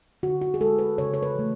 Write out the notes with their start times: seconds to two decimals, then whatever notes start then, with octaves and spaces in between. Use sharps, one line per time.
0.23 D3 F#4
0.41 F#4
0.54 G#4
0.61 G#3 A4
0.79 B4
0.98 C#3 C#5
1.14 C#5
1.23 B4
1.35 E3 A3